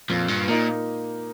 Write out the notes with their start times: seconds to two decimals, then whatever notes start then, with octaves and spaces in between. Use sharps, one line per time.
0.09 F2 A#2
0.28 G2
0.48 A#2 A#3 D#4